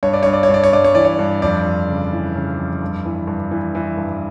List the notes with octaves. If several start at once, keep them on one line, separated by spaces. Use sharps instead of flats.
G2 C#5
D5
G2 C#5
D5
C#5
G2 D5
C#5
G2 D5
C#5
E3 D5
C#5
G2
F2 D5
F2
C#3
E3
C#3
F2
G2
E3
G2
E3
E3
G2